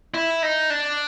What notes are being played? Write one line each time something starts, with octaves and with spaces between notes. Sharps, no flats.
E4
D#4
D4